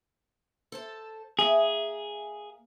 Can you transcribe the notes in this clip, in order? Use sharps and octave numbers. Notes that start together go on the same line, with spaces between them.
A4 C5 A5
A#3 G#4 E5